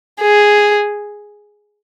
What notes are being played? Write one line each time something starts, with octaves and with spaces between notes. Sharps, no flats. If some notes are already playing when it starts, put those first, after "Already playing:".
G#4